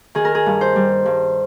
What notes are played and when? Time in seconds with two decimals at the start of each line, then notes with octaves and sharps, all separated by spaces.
0.15 D#3 G#4
0.25 A#4
0.35 G#4
0.46 G2
0.61 C5
0.76 G3
1.05 G2